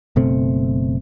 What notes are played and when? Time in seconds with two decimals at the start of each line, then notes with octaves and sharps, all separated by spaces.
0.16 F#1 B2 A3 C4